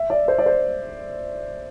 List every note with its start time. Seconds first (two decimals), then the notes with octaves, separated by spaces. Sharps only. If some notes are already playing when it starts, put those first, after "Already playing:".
Already playing: E5
0.10 D5
0.28 C5
0.39 D5
0.46 C5